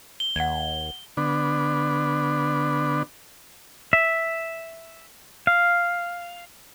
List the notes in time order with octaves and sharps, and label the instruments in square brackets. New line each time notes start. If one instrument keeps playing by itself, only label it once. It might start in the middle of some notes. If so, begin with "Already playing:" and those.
[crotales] G7
[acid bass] D#2 [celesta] F#5 G#6
[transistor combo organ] D3 B3 D4
[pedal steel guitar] E5
F5